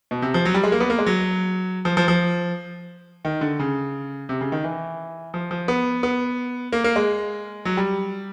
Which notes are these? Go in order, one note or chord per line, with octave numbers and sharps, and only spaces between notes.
B2
C3
F3
F#3
G3
G#3
A#3
B3
A#3
G#3
F#3
F3
F3
F3
D#3
D3
C#3
C3
C#3
D#3
E3
F3
F3
B3
B3
A#3
A#3
G#3
F#3
G3